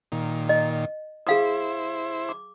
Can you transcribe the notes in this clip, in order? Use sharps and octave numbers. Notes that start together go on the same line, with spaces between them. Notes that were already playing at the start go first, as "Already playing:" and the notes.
A#2 D#3
D#5
E4 G#4 C5 F5 D#6
D6